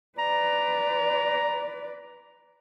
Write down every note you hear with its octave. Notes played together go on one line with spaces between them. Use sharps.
B4 D5 A#5